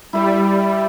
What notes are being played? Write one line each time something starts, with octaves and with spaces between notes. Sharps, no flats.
G3 E4 B5